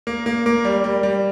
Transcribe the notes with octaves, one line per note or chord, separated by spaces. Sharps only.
A#3
A#3
A#3
G3
G3
G3